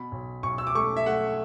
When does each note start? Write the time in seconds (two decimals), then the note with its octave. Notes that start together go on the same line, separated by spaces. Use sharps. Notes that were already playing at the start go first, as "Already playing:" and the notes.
Already playing: B2 B5
0.12 B1
0.43 B1 C#6
0.58 E6
0.67 D6
0.75 A3 C#6
0.97 E5
1.06 A3 F#5